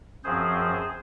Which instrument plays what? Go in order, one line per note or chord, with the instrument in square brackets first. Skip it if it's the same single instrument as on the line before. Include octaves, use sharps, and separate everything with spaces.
[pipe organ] F#2 F3 C4 G#4 C5